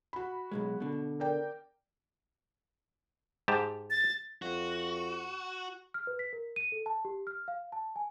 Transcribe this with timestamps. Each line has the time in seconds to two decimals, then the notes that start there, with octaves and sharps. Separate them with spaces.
0.13 F#4 B5
0.52 B1 F#2 G#3
0.80 B2 D3
1.20 A#4 D5 G5
3.48 G#2 G4 A5
3.90 A6
4.42 F2 F#4
5.94 F6
6.07 B4
6.19 B6
6.33 A#4
6.56 D#7
6.72 A4
6.86 A5
7.05 G4
7.27 F6
7.48 F5
7.72 A5
7.96 G#5